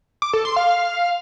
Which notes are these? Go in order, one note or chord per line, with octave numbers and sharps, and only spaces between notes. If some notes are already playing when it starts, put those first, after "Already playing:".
D6
A4
C6
F5